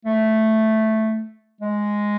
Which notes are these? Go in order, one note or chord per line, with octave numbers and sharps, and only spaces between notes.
A3
G#3